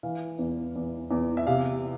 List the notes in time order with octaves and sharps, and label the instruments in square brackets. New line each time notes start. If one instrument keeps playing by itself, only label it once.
[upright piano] E3 F5
E2
E2
E2
E5
C3 F5